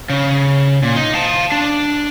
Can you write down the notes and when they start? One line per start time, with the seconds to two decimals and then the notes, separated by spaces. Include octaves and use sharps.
0.10 C#3
0.83 A#2
0.96 D#4
1.14 F5 A5
1.52 D4